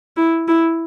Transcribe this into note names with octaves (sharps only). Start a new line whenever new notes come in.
E4
E4